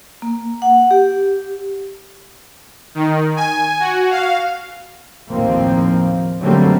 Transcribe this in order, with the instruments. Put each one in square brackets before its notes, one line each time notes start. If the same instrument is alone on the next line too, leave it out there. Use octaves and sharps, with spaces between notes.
[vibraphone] A#3
F#5
G4
[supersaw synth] D#3
G#5
F#4
F5
[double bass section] A1 D#2 F3 A#3 C4
D3 F#3 G3 A3 A#3 C4